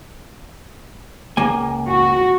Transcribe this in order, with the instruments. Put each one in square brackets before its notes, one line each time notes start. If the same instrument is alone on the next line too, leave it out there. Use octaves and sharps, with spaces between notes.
[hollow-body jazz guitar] C#2 A#3 G#5
[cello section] F#4